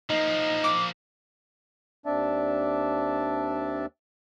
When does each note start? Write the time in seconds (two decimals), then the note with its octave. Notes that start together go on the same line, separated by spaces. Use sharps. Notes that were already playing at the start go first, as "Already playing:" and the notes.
0.10 F3 A#3 D#4
0.64 D6
2.06 D#2 C4 D4 D5 E5 A5